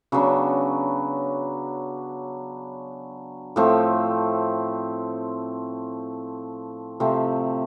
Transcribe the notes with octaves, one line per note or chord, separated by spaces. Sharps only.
C#3 F#3 B3 D4
A2 F3 A3 C4
C3 F3 A3 C4